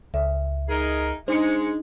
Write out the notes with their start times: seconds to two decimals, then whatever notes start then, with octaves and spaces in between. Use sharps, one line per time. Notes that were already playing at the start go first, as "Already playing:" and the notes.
0.14 C#2 E5
0.69 D#4 G#4 A#4
1.28 G#3 D4 D#4 C5 C#7